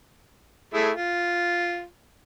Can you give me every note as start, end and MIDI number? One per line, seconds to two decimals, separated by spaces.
0.74 0.90 57
0.74 0.90 64
0.74 0.90 68
0.95 1.84 65